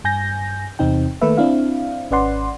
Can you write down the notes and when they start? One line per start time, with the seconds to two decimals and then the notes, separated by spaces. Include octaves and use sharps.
0.04 G2 G#5 G6 A#6
0.79 E2 C3 C4 D#4 G5
1.22 D#3 A3 A#3 B4 E5
1.37 C4 D4 E4 F5
2.11 G#1 C#4 B4 D5 F#5 C6